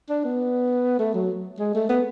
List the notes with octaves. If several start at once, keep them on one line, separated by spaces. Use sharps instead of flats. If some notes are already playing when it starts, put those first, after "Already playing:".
D4
B3
A3
F#3
G#3
A3
B3